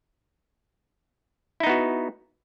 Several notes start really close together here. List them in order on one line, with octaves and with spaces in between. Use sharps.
E4 D#4 B3 F#4